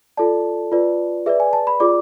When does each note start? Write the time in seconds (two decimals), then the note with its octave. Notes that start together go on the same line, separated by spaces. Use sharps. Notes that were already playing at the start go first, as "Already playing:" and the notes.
0.17 F4 A4 D5 A5
0.72 F4 B4 D5
1.26 G#4 B4 D5 E5
1.40 G#5
1.53 A5
1.67 B5
1.80 F4 G#4 D5 D6